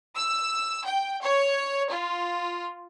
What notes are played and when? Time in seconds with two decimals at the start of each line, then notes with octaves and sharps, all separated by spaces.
0.16 E6
0.85 G5
1.24 C#5
1.91 F4